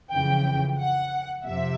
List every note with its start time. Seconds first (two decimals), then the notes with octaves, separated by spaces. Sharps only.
0.11 F2 C#3 E3 G5
0.79 F#5
1.46 F2 C3 E5